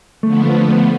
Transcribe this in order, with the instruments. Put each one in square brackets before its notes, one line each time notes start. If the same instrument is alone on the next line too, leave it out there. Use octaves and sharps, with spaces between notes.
[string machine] D3 F3 B3 [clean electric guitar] A3
[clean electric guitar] A3
A3